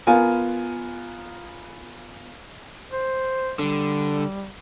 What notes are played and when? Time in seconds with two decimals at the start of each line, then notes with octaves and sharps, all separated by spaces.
0.07 B3 F4 A#4 G#5
2.92 C5
3.59 D3 G3